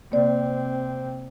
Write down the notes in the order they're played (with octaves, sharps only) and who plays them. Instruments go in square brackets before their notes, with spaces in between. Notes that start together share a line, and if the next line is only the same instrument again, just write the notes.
[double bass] C3 C4 [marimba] A#3 D5